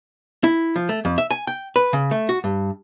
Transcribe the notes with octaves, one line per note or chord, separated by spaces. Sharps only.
E4
F3
A3
F2
E5
G#5
G5
B4
C#3
A3
F#4
G2